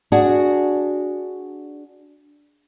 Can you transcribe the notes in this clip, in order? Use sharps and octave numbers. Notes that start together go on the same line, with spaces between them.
D4 F#4 G#4